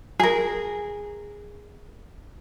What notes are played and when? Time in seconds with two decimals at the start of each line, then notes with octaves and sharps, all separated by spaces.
0.19 G#4 A#4